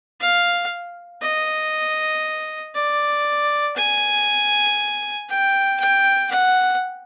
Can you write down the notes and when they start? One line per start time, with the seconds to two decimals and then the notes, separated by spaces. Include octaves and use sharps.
0.20 F5
1.22 D#5
2.75 D5
3.76 G#5
5.30 G5
5.80 G5
6.31 F#5